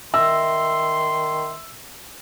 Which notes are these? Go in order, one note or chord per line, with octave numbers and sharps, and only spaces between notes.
D#3 E5 C6 E6